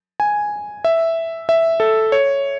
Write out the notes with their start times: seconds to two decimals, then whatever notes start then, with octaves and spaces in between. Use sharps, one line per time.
0.20 G#5
0.84 E5
1.49 E5
1.80 A4
2.12 C#5